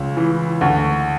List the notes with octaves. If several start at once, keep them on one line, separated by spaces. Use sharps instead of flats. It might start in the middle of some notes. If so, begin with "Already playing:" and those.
Already playing: C#2
E3
D2